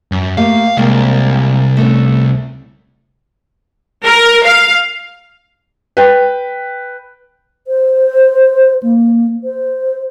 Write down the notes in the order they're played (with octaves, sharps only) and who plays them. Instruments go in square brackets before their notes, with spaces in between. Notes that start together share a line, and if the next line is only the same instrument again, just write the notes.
[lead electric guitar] F#2
[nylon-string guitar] A3 A#3 G4 [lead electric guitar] F5
[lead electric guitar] C2 [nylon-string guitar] G#3 A#3 G5
[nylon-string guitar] A3 B3 C#4
[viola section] A#4
F5
[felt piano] B4 G5
[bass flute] C5
A#3
C5